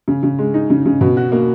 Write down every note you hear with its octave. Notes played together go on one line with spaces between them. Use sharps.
C#3
C#3
G#3
D#4
C#3
C#3
B2
F#4
A#3